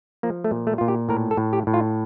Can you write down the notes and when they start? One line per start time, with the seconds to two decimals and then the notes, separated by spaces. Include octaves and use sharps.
0.23 F3 A#3
0.44 A3
0.51 A#2
0.67 A3
0.78 A#2 F4
0.88 G4
1.09 A2 A#4
1.31 A4
1.37 A2
1.53 G4
1.67 A2
1.74 F4